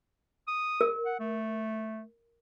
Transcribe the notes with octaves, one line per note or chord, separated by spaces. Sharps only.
D#6
A#4
F#5
A3